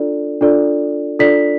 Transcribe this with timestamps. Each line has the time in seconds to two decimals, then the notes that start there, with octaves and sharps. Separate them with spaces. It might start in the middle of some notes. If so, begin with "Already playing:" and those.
Already playing: D4 F4 A4 D5
0.41 D4 F4 A4 D5
1.19 D4 F4 A4 D5 B6